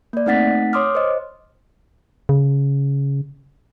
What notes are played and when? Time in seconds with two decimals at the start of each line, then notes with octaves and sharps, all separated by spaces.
0.13 A#3 D5
0.26 A3 C4 D#4 F#5 A6 B6
0.73 C#5 C6 D6 D#6 F6
0.95 C5 D#5
2.29 C#3